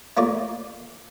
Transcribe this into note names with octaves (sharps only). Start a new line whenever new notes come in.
A3 A#3 F4 C#5 D5